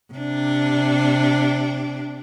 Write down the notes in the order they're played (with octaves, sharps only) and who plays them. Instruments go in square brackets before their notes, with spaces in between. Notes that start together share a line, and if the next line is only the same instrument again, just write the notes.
[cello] C3 D4